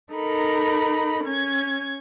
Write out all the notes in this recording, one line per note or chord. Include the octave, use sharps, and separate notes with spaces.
D#4 A4 A#4 B5
C#4 G#6